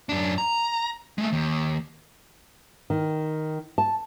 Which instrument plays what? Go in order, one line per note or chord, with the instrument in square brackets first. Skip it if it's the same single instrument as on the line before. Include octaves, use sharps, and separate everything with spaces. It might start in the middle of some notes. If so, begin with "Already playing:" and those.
[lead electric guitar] F#2 D4
A#5
G#3 A3
D#2
[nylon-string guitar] D#3
A5